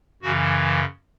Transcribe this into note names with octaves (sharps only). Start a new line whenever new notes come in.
F#2 C#3 E3 F#4